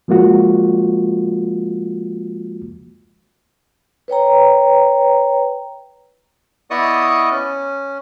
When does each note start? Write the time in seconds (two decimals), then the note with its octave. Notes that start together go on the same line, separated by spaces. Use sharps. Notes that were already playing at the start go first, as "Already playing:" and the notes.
0.08 F3 G#3 A#3 F4 F#4
4.08 B4 C#5 G5 A#5
6.71 B3 E4 D5 D#5 C#6 D#6
7.31 C#4